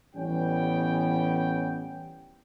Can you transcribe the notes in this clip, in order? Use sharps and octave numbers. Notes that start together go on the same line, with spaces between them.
A1 E3 G3 B3 C#4 G5